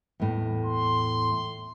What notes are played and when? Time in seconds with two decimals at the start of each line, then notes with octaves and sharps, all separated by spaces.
0.20 E2 A2
0.65 C6